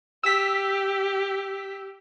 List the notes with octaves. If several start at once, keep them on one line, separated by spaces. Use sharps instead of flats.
G4 E6 B6